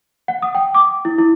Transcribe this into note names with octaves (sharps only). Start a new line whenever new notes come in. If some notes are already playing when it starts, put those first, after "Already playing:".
F#5
D#6
G5
D6
E4
E4